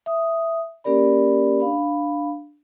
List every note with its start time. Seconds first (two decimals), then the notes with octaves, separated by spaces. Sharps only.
0.06 E5 D#6
0.84 A#3 C#4 G4 A#4 D5 B5
1.60 D4 F5 B5